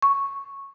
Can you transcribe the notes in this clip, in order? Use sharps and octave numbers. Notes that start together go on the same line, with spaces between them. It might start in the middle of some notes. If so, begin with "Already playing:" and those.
C#6